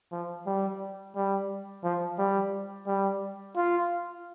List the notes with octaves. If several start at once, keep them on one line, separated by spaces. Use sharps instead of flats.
F3
G3
G3
F3
G3
G3
F4